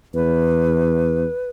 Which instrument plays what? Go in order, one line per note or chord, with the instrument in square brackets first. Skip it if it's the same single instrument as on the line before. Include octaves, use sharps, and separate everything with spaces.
[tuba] E2 [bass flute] B4